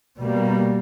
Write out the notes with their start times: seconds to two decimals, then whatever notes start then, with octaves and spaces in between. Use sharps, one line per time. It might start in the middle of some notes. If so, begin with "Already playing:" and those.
0.19 B2 G3 A#3